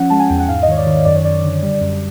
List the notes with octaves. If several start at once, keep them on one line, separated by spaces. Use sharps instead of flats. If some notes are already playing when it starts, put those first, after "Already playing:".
Already playing: F3 C#4 F#5
G#3 A5
G#5
E2 G5
F#5
G#2 F5
D#5
D#3 C#5
D5
D#3
F#2 D5
C#5
F#2 D5
D3
G3
F#2